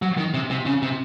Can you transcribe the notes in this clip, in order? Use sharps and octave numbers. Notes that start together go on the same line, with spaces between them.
F#3
D#3
C3
C3
C#3
C3